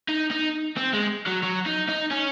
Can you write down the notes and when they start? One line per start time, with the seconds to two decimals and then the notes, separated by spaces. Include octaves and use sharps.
0.09 D#4
0.31 D#4
0.76 C4
0.93 G#3
1.27 F#3
1.43 F#3
1.66 D#4
1.89 D#4
2.11 C#4